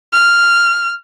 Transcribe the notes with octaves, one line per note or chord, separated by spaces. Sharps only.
F6